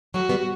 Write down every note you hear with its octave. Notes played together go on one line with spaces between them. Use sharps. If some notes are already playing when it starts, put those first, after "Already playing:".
F#3 A3 F#4
G3 B3